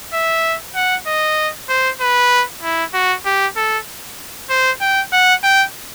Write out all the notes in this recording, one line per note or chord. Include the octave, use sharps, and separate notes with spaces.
E5
F#5
D#5
C5
B4
E4
F#4
G4
A4
C5
G5
F#5
G5